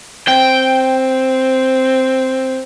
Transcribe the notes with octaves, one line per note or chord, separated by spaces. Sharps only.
C4 G5